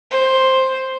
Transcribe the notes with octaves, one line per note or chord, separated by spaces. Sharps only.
C5